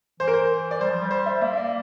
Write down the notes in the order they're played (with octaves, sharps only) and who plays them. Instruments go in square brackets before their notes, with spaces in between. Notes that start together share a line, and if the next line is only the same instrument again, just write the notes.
[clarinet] E3 [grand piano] C5
[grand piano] A#4
C5
D5
[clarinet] G3 [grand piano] C5
[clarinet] F3
G3
[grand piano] C5
E5
[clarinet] A#3 [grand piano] E5
[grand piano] E5
D5